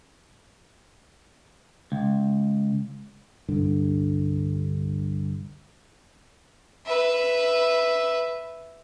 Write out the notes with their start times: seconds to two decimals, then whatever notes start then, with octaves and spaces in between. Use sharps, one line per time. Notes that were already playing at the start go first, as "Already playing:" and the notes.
1.92 C#2
3.49 G1 C2 G2 D3
6.86 B4 E5